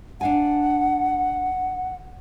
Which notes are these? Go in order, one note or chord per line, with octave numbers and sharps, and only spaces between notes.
D4 F5 F#5 G#5